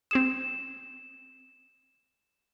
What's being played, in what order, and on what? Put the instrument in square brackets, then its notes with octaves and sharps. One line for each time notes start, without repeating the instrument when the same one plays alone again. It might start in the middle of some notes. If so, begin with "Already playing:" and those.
[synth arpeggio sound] C4 G#4 D#6 [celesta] E7